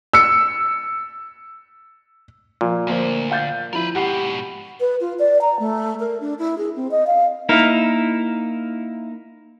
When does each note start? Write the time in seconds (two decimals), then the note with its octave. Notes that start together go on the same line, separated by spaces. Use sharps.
0.13 E6 C#7
2.61 A#2 F3
2.87 D2 F3 A#3 C5
3.31 F5 G6 A6
3.73 F3 E4 A#4 B4
3.95 G#2 B2 G4 F#5 C7
4.80 B4
5.00 F4
5.19 D5
5.41 A#5
5.59 A3
6.00 A#4
6.20 D4
6.39 E4
6.58 G#4
6.76 C4
6.91 D#5
7.07 F5
7.49 A#3 D#4 E4 A#4